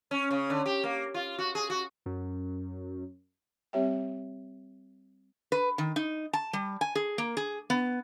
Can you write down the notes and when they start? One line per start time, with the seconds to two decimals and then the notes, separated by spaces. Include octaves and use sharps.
0.11 C#4
0.31 C#3
0.50 D3
0.66 G4
0.84 A#3
1.14 F4
1.38 F#4
1.55 G#4
1.70 F#4
2.06 F#2
3.73 G3 C4 G4 C#5 E5 G5
5.52 B4
5.78 D#3
5.96 D#4
6.33 A5
6.53 G3
6.81 G#5
6.95 G#4
7.18 A#3
7.37 G#4
7.70 B3